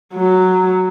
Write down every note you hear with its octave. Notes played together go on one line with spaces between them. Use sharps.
F#3